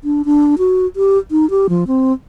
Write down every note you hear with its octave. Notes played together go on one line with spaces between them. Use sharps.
D4
D4
F#4
G4
D#4
G4
F3
C4